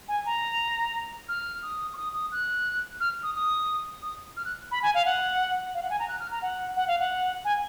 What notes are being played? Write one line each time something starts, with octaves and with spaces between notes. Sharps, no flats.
G#5
A#5
F6
D#6
C#6
D#6
D#6
F#6
F6
D#6
D#6
D#6
F6
F#6
B5
G#5
F5
F#5
F5
F#5
G#5
A#5
F#6
F6
A#5
F#5
F#5
F5
F#5
G#5